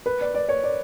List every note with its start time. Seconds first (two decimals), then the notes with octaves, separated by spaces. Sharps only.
0.06 B4
0.21 D5
0.34 D5
0.49 C#5
0.63 D5